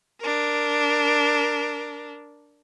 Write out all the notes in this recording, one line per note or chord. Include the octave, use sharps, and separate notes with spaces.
D4 A#4